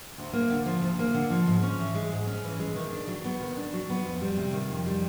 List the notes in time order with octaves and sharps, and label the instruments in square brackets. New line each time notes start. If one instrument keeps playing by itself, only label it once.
[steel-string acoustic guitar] D2
A#3
D3
F3
D2
A#3
D3
F3
G#2
C#4
E3
G#3
G#2
C#4
E3
G#3
D#3
D4
F#3
B3
D#3
D4
F#3
B3
F2
G3
C3
D#3
F2
G3